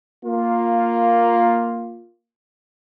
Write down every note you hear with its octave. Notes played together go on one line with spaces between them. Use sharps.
A#3 F4